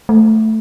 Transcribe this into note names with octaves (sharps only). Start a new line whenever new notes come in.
A3